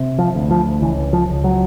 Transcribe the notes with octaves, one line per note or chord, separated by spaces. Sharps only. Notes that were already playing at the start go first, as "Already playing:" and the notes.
Already playing: C3
F3
D2
F3
C#2 E3
F3
C#2
F#3